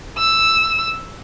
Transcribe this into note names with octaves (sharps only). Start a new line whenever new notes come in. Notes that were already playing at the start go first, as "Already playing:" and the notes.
E6